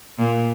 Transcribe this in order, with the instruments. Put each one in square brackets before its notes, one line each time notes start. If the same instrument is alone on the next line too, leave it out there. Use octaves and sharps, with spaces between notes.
[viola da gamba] A#2